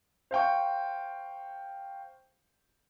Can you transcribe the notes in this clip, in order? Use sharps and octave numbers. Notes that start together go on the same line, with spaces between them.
C5 F5 G5 C#6